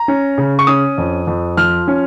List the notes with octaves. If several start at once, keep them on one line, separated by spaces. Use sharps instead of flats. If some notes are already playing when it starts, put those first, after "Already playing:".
Already playing: A#5
C#4
C#3
C#6
C#4 D#6
F2
F2
F3 F6
C#4